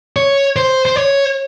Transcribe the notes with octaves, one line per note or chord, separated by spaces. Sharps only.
C#5
C5
C5
C#5